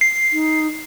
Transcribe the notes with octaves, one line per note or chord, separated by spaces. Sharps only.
C7
D#4